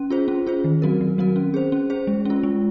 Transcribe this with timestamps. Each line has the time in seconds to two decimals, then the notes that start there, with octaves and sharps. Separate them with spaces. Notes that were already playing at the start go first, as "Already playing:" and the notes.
Already playing: C#4
0.10 F4 G#4 C5
0.28 C#4
0.47 F4 G#4 C5
0.64 D#3
0.82 F#3 C4 F#4 A#4
1.01 D#3
1.18 F#3 C4 F#4 A#4
1.36 C#4
1.54 G#4 C5
1.72 C#4
1.90 G#4 C5
2.07 G#3
2.25 C#4 F4
2.43 G#3